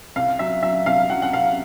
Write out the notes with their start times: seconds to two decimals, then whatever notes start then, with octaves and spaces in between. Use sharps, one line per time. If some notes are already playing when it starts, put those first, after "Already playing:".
0.16 C2 F5
0.39 F#3 E5
0.63 F#3 E5
0.86 C2 F5
1.09 F#3 F#5
1.22 F#5
1.33 C2 F5